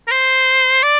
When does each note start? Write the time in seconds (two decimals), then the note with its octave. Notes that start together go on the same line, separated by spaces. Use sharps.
0.07 A#4
0.11 C5
0.83 D5